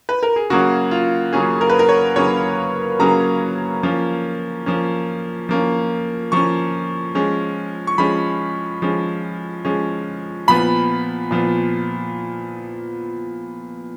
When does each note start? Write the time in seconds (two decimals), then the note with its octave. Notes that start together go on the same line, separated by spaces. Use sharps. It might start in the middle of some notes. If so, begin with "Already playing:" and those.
0.09 B4
0.23 A#4
0.36 G#4
0.50 C#3 F#3 A#3 C#4 F#4
0.91 F4
1.33 C#3 F#3 A#3 C#4 G#4
1.61 A#4
1.69 B4
1.79 A#4
1.89 C#5
2.16 C#3 F#3 A#3 C#4 C#5
2.99 C#3 F#3 A#3 C#4 A#5
3.83 F3 A#3 C#4
4.66 F3 A#3 C#4
5.49 F3 A#3 C#4
6.32 F3 A#3 C#4 C#6
7.15 F3 G#3 C#4
7.87 C#6
7.98 F3 G#3 C#4 B5
8.82 F3 G#3 C#4
9.65 F3 G#3 C#4
10.48 A#2 F3 B3 B5
11.31 A#2 F3 B3